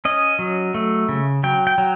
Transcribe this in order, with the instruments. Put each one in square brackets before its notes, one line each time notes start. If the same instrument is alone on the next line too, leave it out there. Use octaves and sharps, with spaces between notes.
[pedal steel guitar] C#4 D#5
F#3
A3
C#3
F#3 G5
G5
F#3